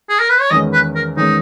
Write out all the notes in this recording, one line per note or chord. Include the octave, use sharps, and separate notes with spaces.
G#4
A#4
B4
C#5
E2 D#3 G#3 C#4 D#5
B4
A#4
E2 D#3 G#3 C#4 D#4